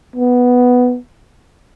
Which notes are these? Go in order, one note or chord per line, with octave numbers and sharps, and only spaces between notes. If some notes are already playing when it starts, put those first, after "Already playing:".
B3